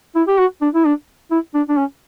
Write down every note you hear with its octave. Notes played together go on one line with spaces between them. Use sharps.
E4
G4
F#4
D4
E4
D4
E4
D4
D4
C#4